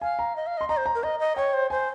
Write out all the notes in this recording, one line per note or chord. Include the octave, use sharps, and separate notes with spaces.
F5 G#5
A#5
D#5
F5
D#5
C6
D#5 A#5
C5
A#5
A#4
D#5 A#5
D#5
C#5 G5
C5
C5 G#5